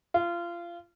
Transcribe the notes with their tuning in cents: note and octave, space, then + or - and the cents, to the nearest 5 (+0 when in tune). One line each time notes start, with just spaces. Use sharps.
F4 -25